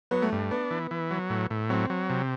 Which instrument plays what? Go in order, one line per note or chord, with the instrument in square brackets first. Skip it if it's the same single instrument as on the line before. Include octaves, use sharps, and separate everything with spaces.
[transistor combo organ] F#3 [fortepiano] B3
[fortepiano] A3
[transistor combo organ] G2
[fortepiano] B3 [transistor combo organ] D4
[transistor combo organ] E3
E3
F#3
A2
A2
[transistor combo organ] F#3 [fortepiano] C4
[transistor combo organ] F#3
C3